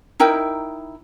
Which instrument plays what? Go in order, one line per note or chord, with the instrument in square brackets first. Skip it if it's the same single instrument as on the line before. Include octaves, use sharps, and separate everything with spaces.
[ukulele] D#4 E4 A#4 G5